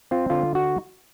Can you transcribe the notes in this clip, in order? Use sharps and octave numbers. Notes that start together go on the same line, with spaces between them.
C4 F4
D3 F4
F#4